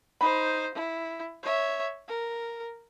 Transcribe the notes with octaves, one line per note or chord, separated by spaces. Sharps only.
D#4 C5 B5
E4
C#5 E5
A#4